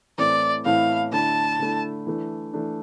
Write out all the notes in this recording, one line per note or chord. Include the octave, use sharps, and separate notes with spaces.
A2 E3 A3 C4 E4 D5
A2 E3 A3 C4 E4 F5
D3 A3 E4 A5
D3 A3 E4
E3 A3 D4
E3 A3 D4